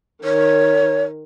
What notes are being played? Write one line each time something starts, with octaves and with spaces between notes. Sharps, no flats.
D#3 C#5